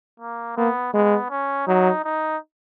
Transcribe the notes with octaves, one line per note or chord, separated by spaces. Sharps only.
A#3
A#3 B3
G#3 B3
C#4
F#3 D#4
D#4